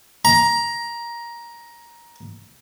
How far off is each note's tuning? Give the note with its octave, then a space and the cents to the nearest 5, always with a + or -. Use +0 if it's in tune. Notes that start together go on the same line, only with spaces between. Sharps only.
A#5 +15